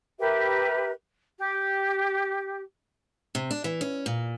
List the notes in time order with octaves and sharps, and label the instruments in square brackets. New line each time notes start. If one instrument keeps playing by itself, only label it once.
[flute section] G4 A#4 B4 E5
G4
[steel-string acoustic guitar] C3
D4
E3
C#4
A#2